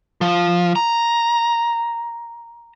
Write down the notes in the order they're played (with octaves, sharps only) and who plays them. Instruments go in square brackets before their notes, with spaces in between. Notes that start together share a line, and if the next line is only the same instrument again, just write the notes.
[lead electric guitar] F3
A#5